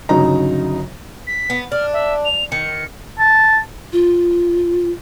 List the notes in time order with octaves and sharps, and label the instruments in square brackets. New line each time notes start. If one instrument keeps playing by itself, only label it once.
[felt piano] G1 C#3 F#3 D#4 A#5
[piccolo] B6
[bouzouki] B3
[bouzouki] D4 [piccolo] F6
[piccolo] E5
F7
[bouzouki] D#3 [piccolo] C#7
[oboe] A5
[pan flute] F4